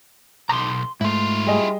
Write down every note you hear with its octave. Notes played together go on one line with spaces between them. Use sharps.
B1 A#5 C6
G#2 A3 E4 F4
G3 G#4 D#5